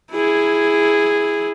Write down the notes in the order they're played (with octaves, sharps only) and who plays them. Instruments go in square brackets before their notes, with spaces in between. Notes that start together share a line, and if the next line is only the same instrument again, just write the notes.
[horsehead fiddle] E4 G#4